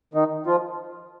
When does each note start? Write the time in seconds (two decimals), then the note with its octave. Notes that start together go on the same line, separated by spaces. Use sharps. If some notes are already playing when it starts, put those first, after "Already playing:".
0.14 D#3 D#4
0.46 F3 F4